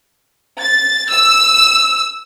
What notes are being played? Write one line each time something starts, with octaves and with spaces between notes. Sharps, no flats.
A6
E6